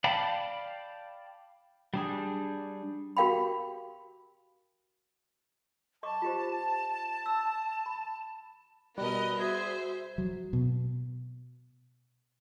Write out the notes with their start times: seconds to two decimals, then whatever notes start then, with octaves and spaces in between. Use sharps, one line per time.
0.04 D5 F5 G5 A5 B5
1.94 G3 D4 G#4
3.17 F#4 G4 A#4 F5 G5 B5
6.03 D#5 A5 C#6 D6
6.22 F4 G4 C5
7.26 E6
7.86 B5
8.98 B2 G3 A#4 B4 D#5
9.39 F#4 G#4 C5 E5
10.18 F#3
10.53 B2